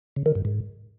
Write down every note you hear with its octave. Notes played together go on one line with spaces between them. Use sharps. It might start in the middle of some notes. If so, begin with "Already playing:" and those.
C#3
D#3
G2
G#2